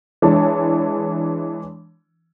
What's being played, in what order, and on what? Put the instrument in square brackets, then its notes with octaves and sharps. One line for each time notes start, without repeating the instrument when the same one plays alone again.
[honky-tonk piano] E3 G#3 D4 C#5 A5